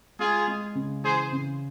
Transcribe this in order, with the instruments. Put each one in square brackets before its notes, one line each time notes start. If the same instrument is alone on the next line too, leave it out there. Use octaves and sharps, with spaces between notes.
[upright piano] G#3 [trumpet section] F4 G#4
[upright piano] G#3
C#3
[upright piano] E3 [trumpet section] G#4 C5
[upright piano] C#3